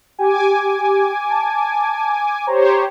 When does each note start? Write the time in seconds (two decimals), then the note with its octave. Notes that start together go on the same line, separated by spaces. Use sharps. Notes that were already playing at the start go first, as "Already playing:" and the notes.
0.19 G4 G#5 D6
1.30 A5
2.47 G4 C5 C#5 A#5